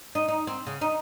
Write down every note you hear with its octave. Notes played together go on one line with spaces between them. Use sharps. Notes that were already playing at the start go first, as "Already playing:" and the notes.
D#4
D#4
C4
C#3
D#4